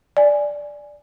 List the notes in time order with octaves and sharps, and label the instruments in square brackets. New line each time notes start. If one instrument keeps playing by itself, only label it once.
[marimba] D5 G#5